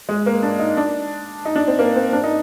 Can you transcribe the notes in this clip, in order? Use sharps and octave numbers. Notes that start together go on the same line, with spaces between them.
G#3
A#3
D4
D#4
D4
D#4
D4
C4
A#3
C4
D4
D#4